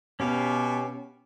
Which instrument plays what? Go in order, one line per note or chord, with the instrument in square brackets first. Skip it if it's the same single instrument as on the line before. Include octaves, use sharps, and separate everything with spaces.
[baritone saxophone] B2 [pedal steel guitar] C#4 G4 F5